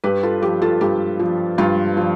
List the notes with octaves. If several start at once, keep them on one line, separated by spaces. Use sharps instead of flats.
G2 G4 B4
F4 A4
F3 G4
F4 A4
G2 G4
F3
G2 F4
F3